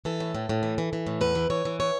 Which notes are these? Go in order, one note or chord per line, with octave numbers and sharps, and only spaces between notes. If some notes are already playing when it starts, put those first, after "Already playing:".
E3 A4
A2
A2
A2
E3
E3
E3
A2
E2 B4
E3
E3 C#5
E3
C#5